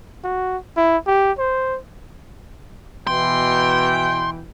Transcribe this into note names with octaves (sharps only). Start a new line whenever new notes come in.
F#4
E4
G4
C5
B2 E3 G5 C6